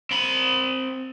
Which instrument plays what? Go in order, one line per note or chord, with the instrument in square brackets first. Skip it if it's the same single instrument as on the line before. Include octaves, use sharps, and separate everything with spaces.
[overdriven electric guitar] C4 B5